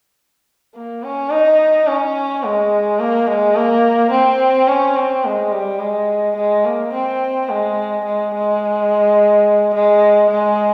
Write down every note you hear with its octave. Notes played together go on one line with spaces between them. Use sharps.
A#3
C#4
D#4
C#4
G#3
A#3
G#3
A#3
C4
C#4
C4
G#3
G3
G#3
G#3
A#3
C4
G#3
G#3
G#3
G#3
G#3